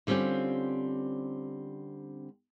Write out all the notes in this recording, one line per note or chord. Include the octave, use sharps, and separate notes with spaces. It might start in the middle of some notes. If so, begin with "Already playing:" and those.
D3 G3 C4 C#4 F4 G4